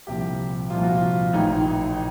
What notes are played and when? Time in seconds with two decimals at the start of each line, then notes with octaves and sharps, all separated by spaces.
0.07 C2 A#2 F3 G4
0.70 C2 A#2 F3 F4
0.83 F#4
0.95 F4
1.33 A1 A2 E3 D#4